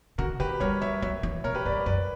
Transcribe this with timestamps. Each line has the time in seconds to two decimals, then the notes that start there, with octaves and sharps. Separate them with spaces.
0.18 D3 F#4 A#4
0.40 D3 G4 B4
0.60 G3 A#4 C#5
0.81 G3 C#5 E5
1.02 F#3 C#5 E5
1.23 E3
1.44 B2 A#4 C#5
1.55 G4 B4
1.65 G2 B4 D5
1.86 F#2 B4 D5